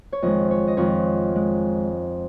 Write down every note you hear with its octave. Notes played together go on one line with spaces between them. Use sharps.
C#5
F2 D#3 G#3 D#5
C#5
D#5
F2 D#3 G#3 C#5
G#3